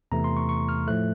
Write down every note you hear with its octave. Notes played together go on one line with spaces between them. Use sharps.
E2 C3 E3 A3 A#5
C6
C#6
C#6
F6
A2 F3 A3 F#6